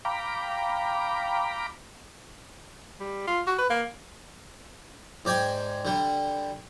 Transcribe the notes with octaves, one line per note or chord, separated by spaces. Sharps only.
F5 G5 A#5 B5 D6
G3
F4
F#4
B4
A#3
G#2 D5 G5 G#5
D3 G3